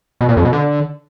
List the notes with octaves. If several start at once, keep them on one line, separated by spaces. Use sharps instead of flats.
B2
A#2
F2
B2
D3